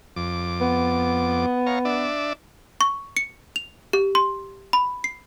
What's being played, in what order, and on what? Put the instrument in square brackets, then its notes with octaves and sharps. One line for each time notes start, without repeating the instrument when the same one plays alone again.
[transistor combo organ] F2 D6
[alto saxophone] B3
[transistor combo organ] C#5 F5 A#5
D4 D5 E5
[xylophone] C#6
C#7
F7
G4
C6
B5
C7